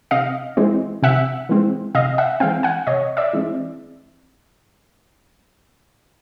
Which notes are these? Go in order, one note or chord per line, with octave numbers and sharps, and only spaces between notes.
C3 D#5 F5
E3 G#3 C4
C3 E5 F#5
E3 G#3 C4
C3 D#5 F5
E5 F#5
E3 G#3 C4 F5 G5
F#5 G#5
C3 C#5 D#5
D5 E5
E3 G#3 C4